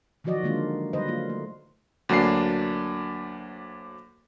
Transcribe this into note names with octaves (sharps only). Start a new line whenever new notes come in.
D#3 F3 F#3 F#4 D5 D#5
D3 D#3 G#3 A#3 D4 F4
D3 F#3 G3 B4 C5 D#5
A#3 F4
A3
D2 F#3 A#3 D4 C7